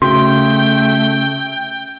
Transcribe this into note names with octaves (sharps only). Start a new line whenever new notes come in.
C#3 A3 F#4 G5